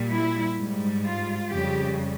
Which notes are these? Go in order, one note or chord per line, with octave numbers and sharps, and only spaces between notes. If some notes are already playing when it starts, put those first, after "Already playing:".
Already playing: A#2 G3
E4
G#2 G3
F4
F2 C#3 G3 G4